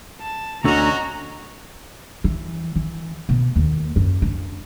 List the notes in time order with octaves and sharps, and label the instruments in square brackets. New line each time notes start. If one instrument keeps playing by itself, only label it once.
[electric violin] A5
[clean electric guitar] D2 D3 [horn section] C#4 F#4 [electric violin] D#5 A#5
[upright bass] E3
E3
B2
D#2
F#2
D4